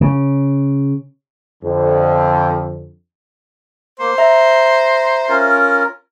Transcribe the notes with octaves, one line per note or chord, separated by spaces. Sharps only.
C#3
F2 D3
A#3 C5
E5 A#5
C#4 F4 A#4